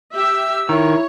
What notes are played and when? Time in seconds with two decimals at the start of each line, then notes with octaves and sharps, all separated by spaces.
0.16 G4 E5 E6
0.69 D#3 E4 C#5